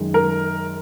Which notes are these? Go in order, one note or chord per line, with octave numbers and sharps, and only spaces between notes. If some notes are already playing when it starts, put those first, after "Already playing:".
Already playing: F#2 D#3 G#3
A#4